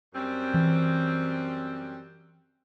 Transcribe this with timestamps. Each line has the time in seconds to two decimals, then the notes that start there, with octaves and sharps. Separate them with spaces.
0.14 F#2 G3 C4
0.54 E3